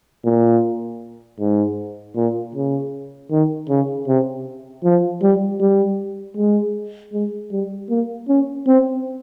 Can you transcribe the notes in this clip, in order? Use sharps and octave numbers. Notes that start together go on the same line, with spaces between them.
A#2
G#2
A#2
C#3
D#3
C#3
C3
F3
G3
G3
G#3
G#3
G3
A#3
C#4
C4